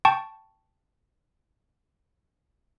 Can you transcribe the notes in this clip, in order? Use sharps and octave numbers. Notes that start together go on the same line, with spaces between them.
G5 A5 C#6